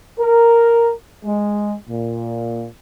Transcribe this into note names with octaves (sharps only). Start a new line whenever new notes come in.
A#4
G#3
A#2